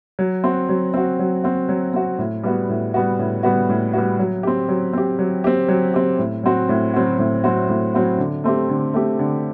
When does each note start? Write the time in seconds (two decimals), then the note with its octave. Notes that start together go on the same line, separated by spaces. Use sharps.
0.19 F#3
0.44 C4 F#4
0.69 F#3
0.94 C4 F#4
1.19 F#3
1.44 C4 F#4
1.69 F#3
1.94 C4 F#4
2.18 A2
2.43 G3 B3 F#4
2.69 A2
2.94 G3 B3 F#4
3.19 A2
3.43 G3 B3 F#4
3.69 A2
3.93 G3 B3 F#4
4.19 F#3
4.43 C4 G4
4.69 F#3
4.93 C4 G4
5.19 F#3
5.44 C4 G4
5.69 F#3
5.94 C4 G4
6.19 A2
6.43 F#3 C4 F#4
6.69 A2
6.94 F#3 C4 F#4
7.19 A2
7.44 F#3 C4 F#4
7.69 A2
7.94 F#3 C4 F#4
8.18 D3
8.44 A3 C4 G4
8.69 D3
8.93 A3 C4 G4
9.19 D3